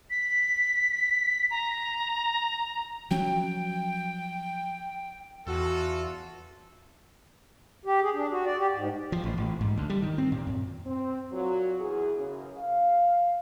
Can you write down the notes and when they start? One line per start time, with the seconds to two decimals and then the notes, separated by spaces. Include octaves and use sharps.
0.10 B6
1.51 A#5
3.11 F3 F#3 C#4 G5
5.47 E2 F4 F#4 A4
7.85 G4
8.01 G#4
8.13 D4
8.31 F#4
8.46 D5
8.58 G4
8.72 G#2
9.12 F3
9.24 A1
9.38 A1
9.61 G#2
9.77 D2
9.90 G3
10.02 D#3
10.18 C4
10.32 A#2
10.47 F#2
10.86 C4
11.32 A#2 F#3
11.80 E2 G#4
12.17 F#2 C#3
12.58 F5